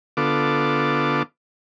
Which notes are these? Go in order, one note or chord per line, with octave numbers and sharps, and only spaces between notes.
D3 B3 F4 A4 D6